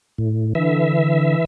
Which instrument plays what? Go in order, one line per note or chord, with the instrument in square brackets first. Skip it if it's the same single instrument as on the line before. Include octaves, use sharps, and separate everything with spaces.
[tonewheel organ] A2
[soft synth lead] D3 [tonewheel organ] E3 E5